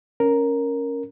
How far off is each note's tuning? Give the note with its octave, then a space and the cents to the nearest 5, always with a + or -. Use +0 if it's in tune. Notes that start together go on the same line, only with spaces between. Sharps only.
C#4 +0 A#4 +0